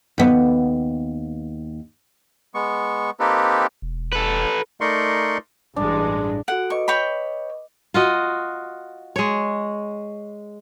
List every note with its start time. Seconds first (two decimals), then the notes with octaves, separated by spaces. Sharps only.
0.18 D#2 B3
2.54 G#3 B3 C#6
3.20 A#3 C4 D#4 G4 A4 B4
3.82 E1
4.12 A4 B4
4.81 A3 D#4 A#4 D5 C6 C#6
5.76 A1 G2 G#3 D4
6.48 F#4 A4 F#5 D7
6.70 B4 D#5 C#6 D6
6.88 C#5 G5 B5
7.94 F4 F#4 D#5
9.16 G#3 C#5